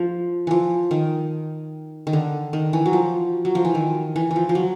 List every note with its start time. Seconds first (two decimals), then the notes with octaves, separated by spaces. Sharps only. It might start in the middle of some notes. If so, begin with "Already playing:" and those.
Already playing: F3
0.47 E3 F3
0.91 D#3
2.07 D#3
2.13 D3
2.53 D#3
2.73 E3
2.86 F#3
2.93 F3
3.45 F#3
3.55 F3
3.65 E3
3.75 D#3
4.16 E3
4.31 E3
4.36 F3
4.49 F3
4.55 F#3